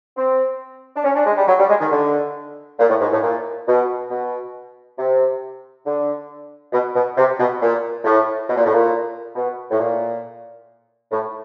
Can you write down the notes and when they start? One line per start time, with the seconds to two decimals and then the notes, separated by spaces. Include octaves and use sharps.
0.16 C4
0.96 D4
1.04 C#4
1.15 D4
1.26 G#3
1.36 G3
1.48 F#3
1.59 G3
1.69 G#3
1.81 D#3
1.91 D3
2.79 A#2
2.89 A2
3.01 G#2
3.12 A2
3.22 A#2
3.67 B2
4.10 B2
4.98 C3
5.86 D3
6.73 B2
6.95 B2
7.17 C3
7.39 B2
7.61 A#2
8.04 A2
8.48 B2
8.57 A#2
8.65 A2
8.74 A#2
9.36 B2
9.71 A2
9.79 A#2
11.11 A2